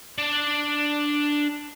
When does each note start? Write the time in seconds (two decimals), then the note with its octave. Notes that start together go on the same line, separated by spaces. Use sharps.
0.18 D4 D5